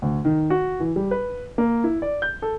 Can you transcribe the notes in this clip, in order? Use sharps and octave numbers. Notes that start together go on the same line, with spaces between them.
D2
D#3
F#4
E3
G3
B4
A#3
E4
D5
G6
A4